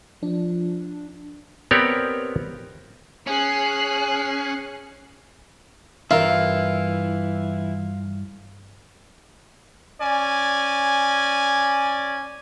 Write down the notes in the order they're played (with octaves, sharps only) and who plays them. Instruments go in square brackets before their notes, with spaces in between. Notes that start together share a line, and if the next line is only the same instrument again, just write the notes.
[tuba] F3 [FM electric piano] D4
[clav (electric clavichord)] B3 C4 G4 A#4 C#5 D5
[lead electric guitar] C#4 [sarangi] G#4 [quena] G#5 [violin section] F#6 C7
[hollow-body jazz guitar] G2 A#4 E5 [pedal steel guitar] E3 E4 [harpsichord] F4
[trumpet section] C#4 D5 G#5